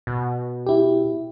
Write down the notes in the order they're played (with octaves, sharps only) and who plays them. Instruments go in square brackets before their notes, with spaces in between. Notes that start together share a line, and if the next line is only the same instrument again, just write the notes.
[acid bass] B2
[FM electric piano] E4 G4